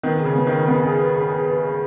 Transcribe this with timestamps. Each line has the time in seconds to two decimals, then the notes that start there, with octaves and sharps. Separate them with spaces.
0.03 D#3 B3
0.19 G#4
0.25 C#3
0.36 B3
0.47 D#3
0.52 B4
0.68 B3
0.83 G#4
1.00 B4
1.16 G#4
1.32 G#4
1.48 B4
1.64 G#4